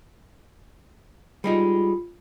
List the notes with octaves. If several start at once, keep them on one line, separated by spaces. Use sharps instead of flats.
G3 G#3 D#4 F4 B5